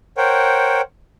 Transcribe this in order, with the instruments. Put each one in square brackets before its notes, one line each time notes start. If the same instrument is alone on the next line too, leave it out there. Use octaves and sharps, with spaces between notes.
[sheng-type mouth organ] A#4 C5 C#5 F#5 G5